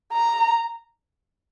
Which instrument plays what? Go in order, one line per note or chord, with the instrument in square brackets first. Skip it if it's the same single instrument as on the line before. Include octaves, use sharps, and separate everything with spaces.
[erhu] A#5